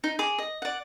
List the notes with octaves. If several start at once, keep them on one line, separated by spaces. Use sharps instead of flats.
D#4
G#4 D6
D#5
D5 F#5